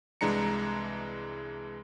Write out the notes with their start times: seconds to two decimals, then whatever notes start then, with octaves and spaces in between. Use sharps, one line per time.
0.21 C2 E3 G#3 D4 A#5 C#7